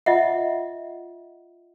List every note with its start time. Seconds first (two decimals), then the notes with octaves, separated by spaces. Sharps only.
0.06 F4 D#5 E5 F#5